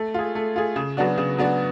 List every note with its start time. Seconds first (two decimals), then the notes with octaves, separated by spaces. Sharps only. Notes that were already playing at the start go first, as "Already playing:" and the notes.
Already playing: A3
0.14 F4 G#4
0.35 A3
0.56 F4 G#4
0.76 C#3
0.97 F#3 B3 D4 F#4
1.18 C#3
1.38 F#3 B3 D4 F#4